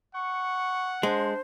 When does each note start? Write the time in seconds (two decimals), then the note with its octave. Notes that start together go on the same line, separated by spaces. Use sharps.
0.15 F#5 C#6
1.03 G#3 D4 C5